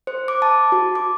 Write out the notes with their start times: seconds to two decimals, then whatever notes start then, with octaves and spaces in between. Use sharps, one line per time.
0.07 C5
0.28 D6
0.42 A5
0.72 F#4
0.95 D6